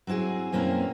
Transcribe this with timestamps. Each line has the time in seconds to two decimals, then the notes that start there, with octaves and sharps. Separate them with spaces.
0.07 F#3 C4 E4 F#4 G#4
0.52 F#2 B2 A#3 C4 C#4 E4